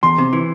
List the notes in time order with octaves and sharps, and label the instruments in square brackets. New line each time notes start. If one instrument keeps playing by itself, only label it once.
[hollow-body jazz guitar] E2 [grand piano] C6
[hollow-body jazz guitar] C3
E3